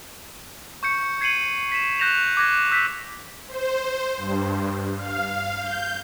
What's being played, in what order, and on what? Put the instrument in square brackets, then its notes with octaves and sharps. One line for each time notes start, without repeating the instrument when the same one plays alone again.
[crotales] C#6 G6 C#7
G#6 C7 C#7 D#7 F#7
B6 E7
F#6 G6 A#6 E7 F7
D6 F#6 G#6 A#6
D6 E6 G6 B6
[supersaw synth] C5
G2
F5
G6